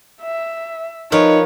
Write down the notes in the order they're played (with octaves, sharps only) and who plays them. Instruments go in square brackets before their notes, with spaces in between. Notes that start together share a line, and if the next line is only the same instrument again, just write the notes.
[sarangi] E5
[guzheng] F3 A#4 B4 [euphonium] D#4 [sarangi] C#5